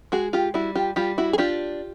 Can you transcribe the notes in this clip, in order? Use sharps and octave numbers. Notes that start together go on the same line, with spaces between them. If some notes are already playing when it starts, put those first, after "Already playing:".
G#3 F#4 G#4
F4 G4
G3 E4 F#4
F4 G4
G3 F4 G4
E4 F#4
G#4
D4 F4 G4